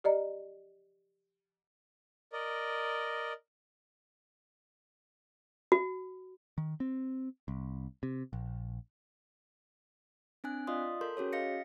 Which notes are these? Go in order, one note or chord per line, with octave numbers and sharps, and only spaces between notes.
G4 D5 D#5 A#5
A#4 D5 D#5
F#4
D#3
C4
C2
C3
A#1
C4 D4 G#5 F#6
F4 D5 D#5 F5 C6 D#6
A4 A#4 C6 G6
C#4 F#4 G#4 C#5
D#5 F5 A#6 C#7